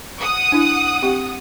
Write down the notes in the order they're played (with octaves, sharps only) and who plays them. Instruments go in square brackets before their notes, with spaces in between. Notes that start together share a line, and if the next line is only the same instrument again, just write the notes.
[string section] F#5 D#6
[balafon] D4 E4
C4 G4 C#6